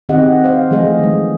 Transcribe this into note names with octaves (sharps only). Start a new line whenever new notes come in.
D#3 C4 G4 G#4 D#5 F#5
C5 F5
E3 F3 A3 G#4 D#5
D#3 G#3